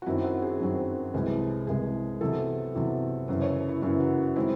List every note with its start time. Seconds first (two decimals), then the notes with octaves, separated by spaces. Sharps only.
0.02 F#4
0.06 F#2 D#3 F#3 C4 E4
0.24 F#4
0.42 G#4
0.60 F#2 D#3 F#3 C4
1.14 C2 C3 E3 G#3
1.67 C2 C3 E3 G#3 G#4
2.21 E2 C3 F#3 A4
2.75 E2 C3 F#3
3.28 F#2 C#3 E3 C5
3.42 C#5
3.69 E4
3.82 F#2 C#3 E3 E4
4.00 F#4
4.36 D#3 G#3 C4 E4